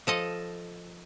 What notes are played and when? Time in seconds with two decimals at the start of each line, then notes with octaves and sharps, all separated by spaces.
0.07 F3 A4 D#5